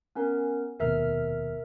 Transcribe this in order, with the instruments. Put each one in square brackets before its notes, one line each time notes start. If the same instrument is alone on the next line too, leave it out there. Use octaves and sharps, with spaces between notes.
[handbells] B3 C#4 A#4
[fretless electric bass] F1 D#2 B2 [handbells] A#4 E5 F6